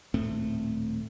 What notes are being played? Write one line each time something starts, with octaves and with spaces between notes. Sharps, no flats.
D#1 A2 A3 C4